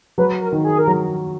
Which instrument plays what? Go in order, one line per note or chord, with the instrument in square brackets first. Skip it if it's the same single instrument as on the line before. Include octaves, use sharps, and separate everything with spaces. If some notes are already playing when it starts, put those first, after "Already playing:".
[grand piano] F#3 [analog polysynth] B4
[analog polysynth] A#4
[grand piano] D#3
[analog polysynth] G#4
A#4
[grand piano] F#3